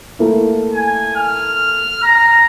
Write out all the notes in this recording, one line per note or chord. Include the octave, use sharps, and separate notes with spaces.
A3 A#3 E4
G#5
F6
A#5